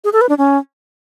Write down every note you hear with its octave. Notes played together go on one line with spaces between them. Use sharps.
G#4
A4
B4
D4
C#4